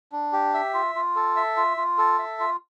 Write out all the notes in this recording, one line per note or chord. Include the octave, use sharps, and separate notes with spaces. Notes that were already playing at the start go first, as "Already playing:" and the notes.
D4
G4
E5
F4
F4
A4
E5
F4
F4
A4
E5
F4